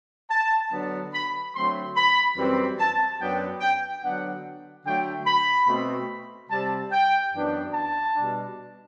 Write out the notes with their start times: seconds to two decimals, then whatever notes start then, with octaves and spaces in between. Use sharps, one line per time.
0.31 A5
0.72 D3 F#3 B3 D4
1.14 B5
1.54 D3 F#3 A3 C4 C6
1.97 B5
2.37 F#2 E3 G3 C4
2.79 A5
3.21 F#2 F#3 B3 D4 G5
3.61 G5
4.02 D3 F#3 B3 D4 F#5
4.85 D3 F#3 A3 G5
5.27 B5
5.68 B2 A3 C4
6.50 C3 G3 C4 A5
6.92 G5
7.33 F#2 E3 B3 D4
7.74 A5
8.16 B2 G3 D4